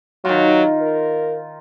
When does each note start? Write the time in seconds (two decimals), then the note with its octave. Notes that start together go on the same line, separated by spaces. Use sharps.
0.25 D#3 F#3 F4
0.81 A#4